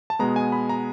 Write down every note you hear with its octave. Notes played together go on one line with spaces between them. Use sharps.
A5
B2 G#3 B3 A#5
G#5
B5
A#5